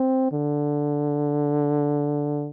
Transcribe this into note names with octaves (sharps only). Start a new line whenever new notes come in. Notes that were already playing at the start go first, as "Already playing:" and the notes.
Already playing: C4
D3